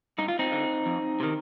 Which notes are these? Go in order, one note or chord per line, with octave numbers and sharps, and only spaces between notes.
G2 D#4
F4
C4 D#4
D3
F2
C3 D#3